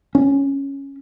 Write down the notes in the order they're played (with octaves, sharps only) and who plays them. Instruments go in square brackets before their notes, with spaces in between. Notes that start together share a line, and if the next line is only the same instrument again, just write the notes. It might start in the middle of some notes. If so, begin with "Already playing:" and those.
[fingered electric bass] C#4